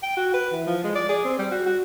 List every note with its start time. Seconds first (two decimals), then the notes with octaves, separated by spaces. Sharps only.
0.03 G5
0.17 F#4
0.34 B4
0.53 E3
0.67 F3
0.84 G#3
0.95 D5
1.09 G#4
1.25 C4
1.39 G3
1.51 F#4
1.66 F#4